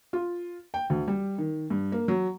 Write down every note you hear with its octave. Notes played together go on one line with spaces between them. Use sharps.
F4
G5
D2
G3
D#3
G2
A#3
F#3